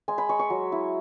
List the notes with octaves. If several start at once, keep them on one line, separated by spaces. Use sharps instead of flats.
G#3 G#5
B5
G#3 C#6
C#6
F#3
E4